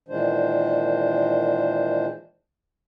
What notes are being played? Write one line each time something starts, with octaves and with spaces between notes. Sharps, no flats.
A#2 D#3 E3 G#3 D4 C5